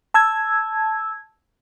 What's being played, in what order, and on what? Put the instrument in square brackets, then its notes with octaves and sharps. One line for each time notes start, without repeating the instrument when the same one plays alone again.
[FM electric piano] A5 E6 G#6